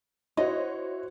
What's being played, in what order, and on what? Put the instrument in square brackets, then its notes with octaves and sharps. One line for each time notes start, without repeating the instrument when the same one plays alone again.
[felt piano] E4 [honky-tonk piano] F#4 C5 C#5 [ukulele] D#5